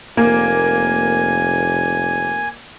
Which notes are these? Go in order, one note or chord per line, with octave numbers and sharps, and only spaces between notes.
F1 A#3 G#5